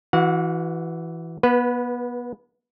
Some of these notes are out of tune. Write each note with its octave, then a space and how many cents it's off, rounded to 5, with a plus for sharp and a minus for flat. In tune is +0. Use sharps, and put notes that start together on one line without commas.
E3 +0 F#4 +0 F#5 -45
B3 -30 B4 +0